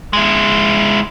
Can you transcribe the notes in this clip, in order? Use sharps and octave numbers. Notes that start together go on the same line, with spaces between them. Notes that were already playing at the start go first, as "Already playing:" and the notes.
G#3 E4